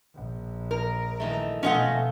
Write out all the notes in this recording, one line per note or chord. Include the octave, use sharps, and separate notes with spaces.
A#1
A#4
D#3 E3 A3
B2 F3 A3 C#4 F4 A4 D#5 F#5